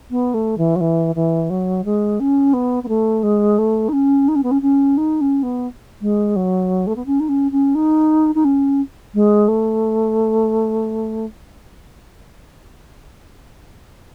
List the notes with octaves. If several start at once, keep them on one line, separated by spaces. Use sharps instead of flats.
B3
A3
E3
F#3
E3
E3
F#3
G#3
C#4
B3
B3
A3
G#3
A3
D#4
C#4
D#4
C#4
B3
C#4
C#4
D#4
C#4
B3
G#3
F#3
A3
B3
C#4
D#4
C#4
C#4
D#4
D#4
C#4
G#3
A3